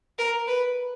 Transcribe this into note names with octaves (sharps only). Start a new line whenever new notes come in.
A#4
B4